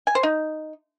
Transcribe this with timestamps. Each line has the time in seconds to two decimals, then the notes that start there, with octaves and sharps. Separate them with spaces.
0.07 G#5
0.15 C5
0.23 D#4